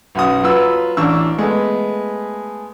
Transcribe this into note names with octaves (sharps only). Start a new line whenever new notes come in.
B1 F#2 F#4 D#6
F#3 F4 B4 E6
A1 D4 C#6 E6
G#3 A3 B3